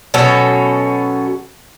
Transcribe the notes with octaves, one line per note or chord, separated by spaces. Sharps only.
B2 F#3 C#4 A4